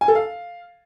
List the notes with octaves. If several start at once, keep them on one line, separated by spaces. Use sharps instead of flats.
G#5
A4
F5